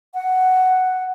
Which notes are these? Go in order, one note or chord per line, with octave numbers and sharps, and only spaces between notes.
F#5